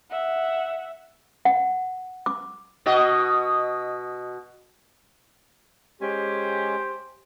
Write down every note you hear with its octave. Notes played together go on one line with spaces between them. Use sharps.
E5 F#5
F#5
D6
B2 F#4 D#5
G#3 C#4 G4 C5 G#5